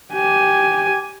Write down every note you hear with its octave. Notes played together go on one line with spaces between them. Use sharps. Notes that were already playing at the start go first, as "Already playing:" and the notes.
G4 G#5